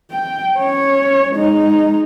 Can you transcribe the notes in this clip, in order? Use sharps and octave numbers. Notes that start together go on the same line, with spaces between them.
G5
C#4 C#5
G#3 D#4